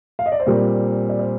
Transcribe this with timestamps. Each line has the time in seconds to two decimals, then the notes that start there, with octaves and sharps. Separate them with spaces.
0.19 F5
0.26 D#5
0.32 D5
0.40 C5
0.47 A#2 G3 C4 A#4
1.09 D5
1.19 C5